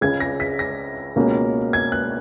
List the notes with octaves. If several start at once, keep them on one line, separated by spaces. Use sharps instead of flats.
C#2 C#3 G#3 G#6
A#6
B6
A#6
C#2 B2 A#3 C#4
G#6
F#6